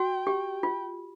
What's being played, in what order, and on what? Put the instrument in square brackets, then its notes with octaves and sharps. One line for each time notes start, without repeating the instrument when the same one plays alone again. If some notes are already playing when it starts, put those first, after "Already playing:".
Already playing: [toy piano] F#4 [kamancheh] G5
[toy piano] G4
F4